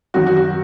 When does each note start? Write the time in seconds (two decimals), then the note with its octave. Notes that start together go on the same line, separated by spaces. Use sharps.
0.14 F#2 D#3 F#3 F#4
0.26 F#4
0.37 F#4